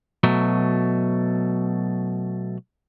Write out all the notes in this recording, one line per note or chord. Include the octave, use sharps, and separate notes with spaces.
B2 F#3 A3